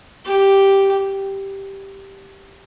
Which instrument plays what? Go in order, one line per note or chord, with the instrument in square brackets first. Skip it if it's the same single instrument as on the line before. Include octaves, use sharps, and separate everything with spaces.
[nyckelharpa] G4